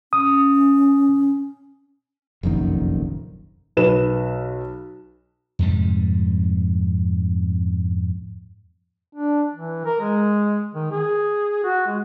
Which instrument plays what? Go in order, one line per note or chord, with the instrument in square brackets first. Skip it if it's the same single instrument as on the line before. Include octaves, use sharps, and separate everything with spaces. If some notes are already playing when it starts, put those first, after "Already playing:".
[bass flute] C#4 [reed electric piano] D#6
[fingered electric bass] F1 A#1 F#2 D#3
[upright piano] B1 B4 E7
[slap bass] F2 G#2 C3 G3
[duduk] D4
E3
A#4
G#3
D#3
G#4
F#4
G#3